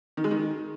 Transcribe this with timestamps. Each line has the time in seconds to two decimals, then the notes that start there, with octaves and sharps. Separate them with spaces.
0.17 D#3
0.24 G#3
0.31 D#3